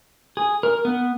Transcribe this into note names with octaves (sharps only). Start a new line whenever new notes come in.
G#4
A#4
B3